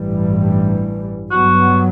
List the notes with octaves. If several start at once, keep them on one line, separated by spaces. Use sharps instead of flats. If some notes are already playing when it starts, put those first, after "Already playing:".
Already playing: A1 G2 E3 G3
G2 F#3 B3 F#4